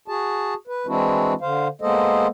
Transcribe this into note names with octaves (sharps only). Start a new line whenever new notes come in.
F#4 G#4 A5
B4
E3 G#3 C4 D4 E4 F#4
D3 C5 F5
G#3 A#3 B3 A4 C5 D#5